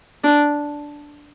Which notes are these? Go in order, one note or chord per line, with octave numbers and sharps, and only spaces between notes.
D4